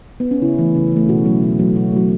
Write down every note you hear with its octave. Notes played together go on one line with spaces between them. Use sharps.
B3
C#4
C#3 E4
E3 A3
C#3
E3 A3
B2 F#4
F#3 A3
B2
F#3 A3
B2 F#4
F#3 A3